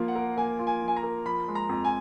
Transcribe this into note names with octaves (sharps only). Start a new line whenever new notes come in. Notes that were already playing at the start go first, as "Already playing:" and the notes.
Already playing: F3 A#3 F4
F#5
A#4
A#3 G#5
F4
G#5
F3
G#5
A#5
A#4
F3 B5
G#3
A#5
F2
G#5